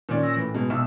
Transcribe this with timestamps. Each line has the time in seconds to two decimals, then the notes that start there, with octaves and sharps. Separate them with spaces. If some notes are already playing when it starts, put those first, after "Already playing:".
0.09 A#2 D#3 C#4 D5
0.23 E6 A#6
0.36 A2 E3
0.54 B2 G#3
0.70 B1 B2 E5 E6